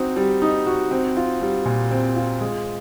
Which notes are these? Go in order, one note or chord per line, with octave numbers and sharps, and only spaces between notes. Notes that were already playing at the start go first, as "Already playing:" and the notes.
Already playing: C4 D#4 F#4
G3
D#4
F#4
C4
F4
G3
A#2
C4
F4
G#3